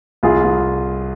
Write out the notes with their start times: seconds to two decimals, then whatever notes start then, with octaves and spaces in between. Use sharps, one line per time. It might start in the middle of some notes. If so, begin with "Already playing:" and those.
0.23 C2 F4 G#4
0.44 C2